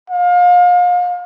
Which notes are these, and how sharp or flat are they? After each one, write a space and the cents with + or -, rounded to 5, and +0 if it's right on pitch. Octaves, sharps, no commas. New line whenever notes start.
F5 +35